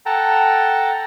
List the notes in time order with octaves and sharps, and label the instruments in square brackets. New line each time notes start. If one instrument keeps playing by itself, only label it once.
[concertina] A4 F#5 G5 A5 A#5